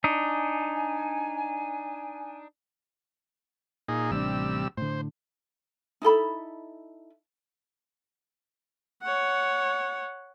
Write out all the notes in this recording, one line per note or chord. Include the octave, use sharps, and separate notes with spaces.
D4 D#4 G#5
A#2 D#4 G#4
A1 C3 G3 D4 E6
A2 D3 C5
D#4 E4 A4 B5
C#5 F#5